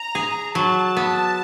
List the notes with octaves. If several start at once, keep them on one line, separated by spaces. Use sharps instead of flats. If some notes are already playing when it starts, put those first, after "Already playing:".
Already playing: A#5
G#4
F#3 A5
B3